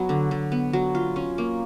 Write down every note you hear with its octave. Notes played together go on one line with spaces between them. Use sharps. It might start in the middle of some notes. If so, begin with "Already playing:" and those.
Already playing: F#3 B3
D3
D3
B3
F#3
F4
C#4
A#3